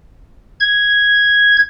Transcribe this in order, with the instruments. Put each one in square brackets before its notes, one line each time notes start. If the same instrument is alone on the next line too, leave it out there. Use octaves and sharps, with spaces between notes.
[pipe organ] G#6